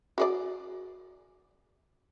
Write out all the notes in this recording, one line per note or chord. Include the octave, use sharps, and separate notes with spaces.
F#4 G#4 D5